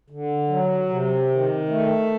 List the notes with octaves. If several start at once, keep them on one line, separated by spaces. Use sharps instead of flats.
D3
F#3
C3
D#3
A3